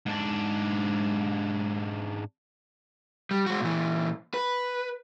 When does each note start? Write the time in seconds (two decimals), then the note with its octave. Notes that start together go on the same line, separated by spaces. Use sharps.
0.06 G#2 D4
3.31 G3
3.46 G#3 F#4
3.61 A#2 E3
4.34 B4